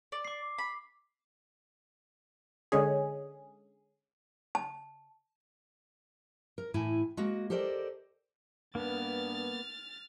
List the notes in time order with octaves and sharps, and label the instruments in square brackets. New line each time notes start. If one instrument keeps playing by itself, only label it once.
[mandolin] D5
[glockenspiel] D6 C7
[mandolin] B5
[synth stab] D3 G#3 C#4 G#4
[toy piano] A5
[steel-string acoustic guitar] A#4
A2 E3 E4 G#5
G#3 A#3 F#4
G4 A4 A#4 C5 D5 D#5
[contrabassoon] G2 [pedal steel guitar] A#3 B3 [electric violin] F6 A6